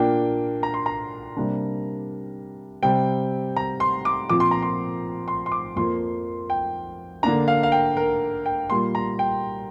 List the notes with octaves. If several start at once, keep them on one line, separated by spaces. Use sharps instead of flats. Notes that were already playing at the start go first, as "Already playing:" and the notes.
Already playing: A#2 A#3 D4 G5
A#5
C6
A#5
C3 G3 A#3 D4
C3 G3 C4 G5
A#5
C6
D6
A#2 F3 C4 D6
C6
A#5
C6
C6
C6
D6
F2 F3 A#3 C6
G5
D3 A#3 D4 A#5
F5
F5
G5
A#4
G5
A#2 G3 A#3 C6
A#5
G5